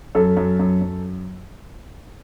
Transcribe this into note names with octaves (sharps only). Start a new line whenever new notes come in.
F#2 A4
F#2
F#2
F#2